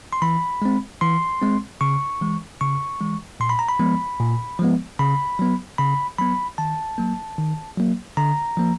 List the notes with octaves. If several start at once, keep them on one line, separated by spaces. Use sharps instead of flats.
C6
E3 B5
G#3 C4
E3 C6
G#3 C4
C#3 C#6
E3 G#3
C#3 C#6
E3 G#3
A#2 C6
B5
A#5
B5
F3 G#3 B3
A#2
F3 G#3 B3
C#3 B5
F#3 B3
C#3 B5
F#3 B3 B5
D#3 A5
F#3 A#3
D#3
F#3 A#3
D3 A#5
F3 A#3